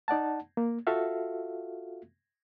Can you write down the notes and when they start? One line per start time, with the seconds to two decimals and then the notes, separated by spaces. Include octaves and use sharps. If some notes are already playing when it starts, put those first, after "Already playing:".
0.08 D#4 D5 F#5 A5
0.57 A#3
0.87 F4 F#4 A4 E5 F5